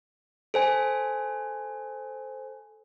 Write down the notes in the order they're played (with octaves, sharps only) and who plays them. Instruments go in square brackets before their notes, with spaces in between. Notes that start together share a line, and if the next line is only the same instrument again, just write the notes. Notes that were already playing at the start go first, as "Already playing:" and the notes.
[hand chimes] A4 C5 G#5